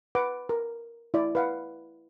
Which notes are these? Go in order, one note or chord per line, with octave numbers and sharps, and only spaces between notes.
B4 F#5 D6
A#4
E4 D5
B4 F5 F#5